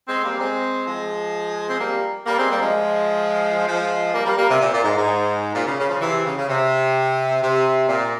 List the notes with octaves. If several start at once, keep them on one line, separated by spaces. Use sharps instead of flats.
G#3 C4
G3 A#3
G#3 C4
F3 G#3
C4
G3 A#3
G3 A#3
G#3 C4
G3 A#3
F3 G#3
F3 G#3
G3 A#3
G3 A#3
G3 A#3
C3
A#2
A#2
G#2
G#2
A#2
C#3
C#3
C#3 F3
C3 E3
C#3
C#3
C3
C3
A#2